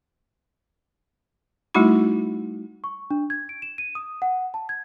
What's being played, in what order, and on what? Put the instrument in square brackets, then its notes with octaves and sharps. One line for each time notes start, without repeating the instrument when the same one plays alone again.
[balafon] G3 A3 D#4 E4 F#4 B5
[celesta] C#6
D4
G#6
D7
E7
D#7
D#6
F#5
A5
G#6